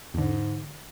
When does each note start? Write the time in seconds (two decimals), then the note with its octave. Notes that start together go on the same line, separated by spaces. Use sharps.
0.14 E2 G#2 D3